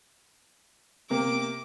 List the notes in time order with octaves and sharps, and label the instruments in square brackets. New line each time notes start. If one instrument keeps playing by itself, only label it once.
[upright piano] C3 A#3 [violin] D6